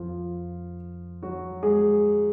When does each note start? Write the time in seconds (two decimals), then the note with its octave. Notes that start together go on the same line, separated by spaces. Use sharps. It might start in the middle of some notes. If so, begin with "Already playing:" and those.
Already playing: F2 F3 F4
1.23 F#3 F#4
1.63 G#3 G#4